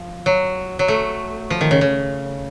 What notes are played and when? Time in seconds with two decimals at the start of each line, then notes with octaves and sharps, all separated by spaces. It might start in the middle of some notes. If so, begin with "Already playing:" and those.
Already playing: F3
0.26 F#3
0.79 F#3
0.88 A3
1.50 F3
1.61 D#3
1.71 C#3
1.81 C#3